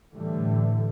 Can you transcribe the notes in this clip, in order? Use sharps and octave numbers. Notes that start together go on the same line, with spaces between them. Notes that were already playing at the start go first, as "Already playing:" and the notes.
A2 D3 E3 G3 A3